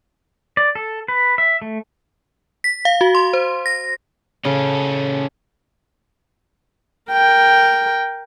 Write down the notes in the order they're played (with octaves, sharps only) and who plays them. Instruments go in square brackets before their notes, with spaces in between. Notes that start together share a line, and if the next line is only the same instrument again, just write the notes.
[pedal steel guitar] D5
A4
B4
E5
A3
[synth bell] B6
F5
F#4
C6
C5
A#6
[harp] C#3 [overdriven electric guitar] C#4 A4
[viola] A#4 G5